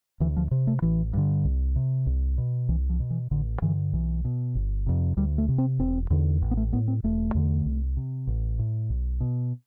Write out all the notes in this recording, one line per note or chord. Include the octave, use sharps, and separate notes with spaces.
D2 E3
F3
C3
A3
A1 E3
G2 D3
C2
C3
C2
B2
C2 E3
F3
B2
E3
A1 D3
G2 D3 E3
B1 E3
B2
G1
F2 C3
D2 G3
A3
C3
C4
E1 C4
E2 D3
A1
B3
A3
A2 B3
C4
E1 A3
E2 D3
C2
C3
A1
A2
B1
B2